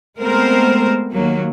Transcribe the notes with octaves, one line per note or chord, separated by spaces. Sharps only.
G#3 A3 B3 C4 A#4 C5
D#2 F#3 A#3